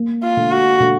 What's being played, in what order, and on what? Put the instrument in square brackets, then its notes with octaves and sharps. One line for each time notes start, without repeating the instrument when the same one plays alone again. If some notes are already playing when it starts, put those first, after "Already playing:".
Already playing: [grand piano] A#3
[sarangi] F4
[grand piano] D3
[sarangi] F#4
[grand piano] D3